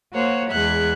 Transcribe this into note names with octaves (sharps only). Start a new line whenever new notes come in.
A#3 F#4 C5 C#5 F#5
E2 G#3 E5 F#5 F#6 G#6